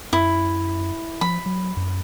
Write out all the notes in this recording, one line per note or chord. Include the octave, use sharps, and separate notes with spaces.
F#2 E4
F3 B5
F#3
F#2